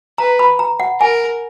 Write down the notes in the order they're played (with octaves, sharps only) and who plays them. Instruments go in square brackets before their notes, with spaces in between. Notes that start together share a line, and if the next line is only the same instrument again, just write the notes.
[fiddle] B4 [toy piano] A#5
[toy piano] B5
A#5
F#5
[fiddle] A#4 [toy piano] G#5